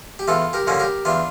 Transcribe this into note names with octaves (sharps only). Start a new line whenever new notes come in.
G4
E2 F4 A4
G4 A#4
D3 F3 A#3 C#4
G4 A#4
E2 D4 F4